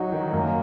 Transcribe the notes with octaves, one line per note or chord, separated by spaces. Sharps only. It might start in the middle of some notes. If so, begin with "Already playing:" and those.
Already playing: F#3 D#4 F#4
D#3
F#2 A#3